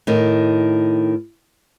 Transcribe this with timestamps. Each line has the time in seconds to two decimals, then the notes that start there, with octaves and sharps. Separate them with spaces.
0.07 A2 D#3